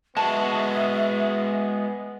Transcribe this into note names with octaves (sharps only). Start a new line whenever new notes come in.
G#3 B3 F#4 E5 A5